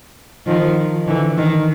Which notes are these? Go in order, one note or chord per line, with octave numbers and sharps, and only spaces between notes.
D#3 F3
D3 E3
D#3